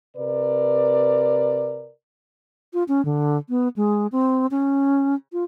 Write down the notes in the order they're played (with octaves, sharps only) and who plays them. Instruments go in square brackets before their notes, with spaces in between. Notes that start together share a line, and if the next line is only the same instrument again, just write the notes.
[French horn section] C3 A#4 B4 D5
[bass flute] F4
C#4
D3
B3
G#3
C4
C#4
F4